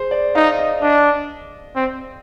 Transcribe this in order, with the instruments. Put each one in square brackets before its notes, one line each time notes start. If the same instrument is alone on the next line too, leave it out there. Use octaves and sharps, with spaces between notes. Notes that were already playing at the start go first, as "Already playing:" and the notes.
Already playing: [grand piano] G#4 C5
D5
[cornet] D#4 [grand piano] F5
[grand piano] D#5
[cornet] D4 [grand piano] D#5
[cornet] C4